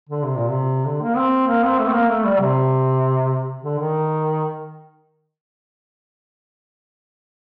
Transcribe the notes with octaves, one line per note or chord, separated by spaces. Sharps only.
D3
C3
A#2
C3
D3
A#3
C4
A#3
C4
A3
C4
A#3
A3
G3
C3
D3
D#3